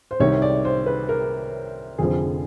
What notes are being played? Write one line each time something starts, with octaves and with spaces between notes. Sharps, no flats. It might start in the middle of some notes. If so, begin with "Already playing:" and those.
C5
C2 C3 D#3 C#5
D5
C5
B4
A#4
F1 F2 D3 F3 G#4